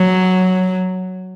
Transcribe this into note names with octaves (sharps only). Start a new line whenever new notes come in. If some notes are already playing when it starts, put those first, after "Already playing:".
Already playing: F#3